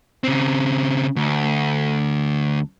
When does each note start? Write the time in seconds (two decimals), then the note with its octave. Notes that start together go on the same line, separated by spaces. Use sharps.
0.24 C#3 C4
1.16 D2